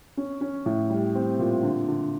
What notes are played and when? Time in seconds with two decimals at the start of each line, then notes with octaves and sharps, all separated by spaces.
0.17 C#4
0.41 C#4
0.66 A2
0.90 G3
1.15 C4
1.39 A#2
1.63 D3
1.88 D3